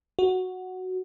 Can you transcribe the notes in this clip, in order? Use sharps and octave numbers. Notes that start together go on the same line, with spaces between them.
F#4